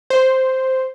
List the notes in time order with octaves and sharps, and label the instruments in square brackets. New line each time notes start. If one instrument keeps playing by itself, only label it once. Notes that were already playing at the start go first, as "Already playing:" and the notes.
[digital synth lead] C5